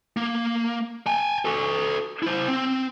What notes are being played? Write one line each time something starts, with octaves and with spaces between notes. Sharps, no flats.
A#3
G5 G#5
F#4 A4
E4 C5
C4